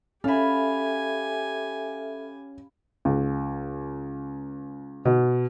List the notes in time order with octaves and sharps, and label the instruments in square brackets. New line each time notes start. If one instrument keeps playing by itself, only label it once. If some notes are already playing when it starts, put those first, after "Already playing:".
[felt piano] C#4 [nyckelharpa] G4 G#5 [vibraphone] A4 E5 [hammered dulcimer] F5 B5
[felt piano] C#2
B2